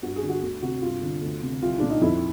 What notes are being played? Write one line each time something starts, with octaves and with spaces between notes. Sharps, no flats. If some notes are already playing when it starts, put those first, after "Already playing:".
G2 F#4
G#4
D3
F#4
D2
C3 F#4
G2 F4
D3
D2
C3
C2 F4
A#2 D4
D#4
F2 E4